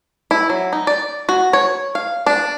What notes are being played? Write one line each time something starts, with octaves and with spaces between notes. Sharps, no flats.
E4
F#3
D#4
D5
F#4
C#5
F5
D4